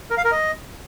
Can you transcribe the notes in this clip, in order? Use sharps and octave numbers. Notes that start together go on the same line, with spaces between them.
A#4
F5
A#4
D#5